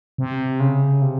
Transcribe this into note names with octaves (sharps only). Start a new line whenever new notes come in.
C3
C#3
C3